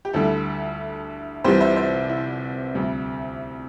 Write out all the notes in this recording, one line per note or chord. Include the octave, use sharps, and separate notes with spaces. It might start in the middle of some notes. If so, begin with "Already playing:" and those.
G4
D2 D3 G3 E4 A4
C2 C3 E3 G3 G4 C5
C5 E5
C5 E5
E4
D2 C3 G3